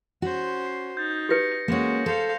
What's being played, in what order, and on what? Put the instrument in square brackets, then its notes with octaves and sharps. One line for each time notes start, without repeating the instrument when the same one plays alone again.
[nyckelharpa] C#4 C5 [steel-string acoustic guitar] F#4
[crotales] C7
[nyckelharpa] D#4 [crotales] G6 A6
[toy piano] G4 B4 [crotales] G6 A#6 C#7
[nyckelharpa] G#3 F#4 [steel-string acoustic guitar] A#3 C#4
[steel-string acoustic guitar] A4 [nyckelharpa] C5 F5